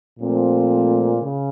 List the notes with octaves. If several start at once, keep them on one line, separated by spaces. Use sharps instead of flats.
A#2 F3 A3 C4
C#3